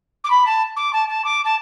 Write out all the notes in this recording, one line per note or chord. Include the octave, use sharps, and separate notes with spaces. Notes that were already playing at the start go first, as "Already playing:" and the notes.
D6
B5
A5
D6
A5
A5
D6
A5